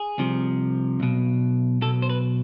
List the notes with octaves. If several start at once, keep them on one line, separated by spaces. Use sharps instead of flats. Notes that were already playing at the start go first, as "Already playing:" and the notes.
Already playing: G#4
C2 C3 F3
B1 B2
B1 B2 A4
C5
B4